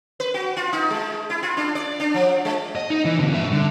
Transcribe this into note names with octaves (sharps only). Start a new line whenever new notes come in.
B4
F#4
F4
D#4
G#3
E4
F4
D4
D5
D4
F3
G#3
D#5
D#4
E3
B2 D3
G2 E5
D3